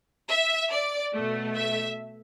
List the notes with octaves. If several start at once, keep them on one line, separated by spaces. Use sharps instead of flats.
E5
D5
B2 A3
E5